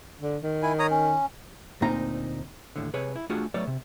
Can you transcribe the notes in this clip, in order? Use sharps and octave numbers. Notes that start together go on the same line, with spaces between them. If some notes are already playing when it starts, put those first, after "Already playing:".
D3
D#3
E4 G#5
C#5 A#5 D#6
C#4
D2 A#2 C4 D#4 A#5
D#2 A2 D3
C3 G#4 B4 C#5
E4
A3 D4 F4 F#4 G#4 F#5
F#3 A3 B3 C#5 D5
C3